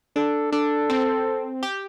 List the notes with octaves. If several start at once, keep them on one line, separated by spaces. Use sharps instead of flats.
D4 A4
D4 A4
C4
G4